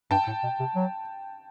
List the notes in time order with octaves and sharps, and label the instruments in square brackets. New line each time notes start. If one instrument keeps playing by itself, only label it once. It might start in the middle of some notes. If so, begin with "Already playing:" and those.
[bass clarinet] G2 [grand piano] G5 A5
[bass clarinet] A2
B2
C3
F#3